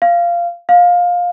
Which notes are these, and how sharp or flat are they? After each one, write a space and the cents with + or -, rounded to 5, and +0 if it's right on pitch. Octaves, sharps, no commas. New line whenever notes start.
F5 -15
F5 +20